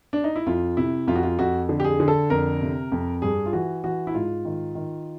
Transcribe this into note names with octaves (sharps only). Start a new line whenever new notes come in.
D4
D#4
E4
F2 F4
C3 E4
F2 F4
F#4
F4
F2 F#4
D3
G4
G#4
D3
A4
F2 A#4
C3
F2
G2 G#4
F4
E3 F#4
E3 F#4
E4
G#2 F4
D#3
D#3